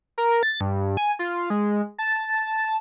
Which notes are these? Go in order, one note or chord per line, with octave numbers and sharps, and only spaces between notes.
A#4
A6
G2
G#5
F4
G#3
A5